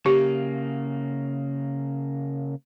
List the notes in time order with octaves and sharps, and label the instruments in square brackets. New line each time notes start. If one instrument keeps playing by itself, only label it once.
[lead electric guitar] C#3 A#3 [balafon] G4